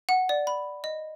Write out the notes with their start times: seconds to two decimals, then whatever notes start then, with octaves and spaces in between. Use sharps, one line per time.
0.09 F#5
0.29 D5
0.47 B5
0.84 D#5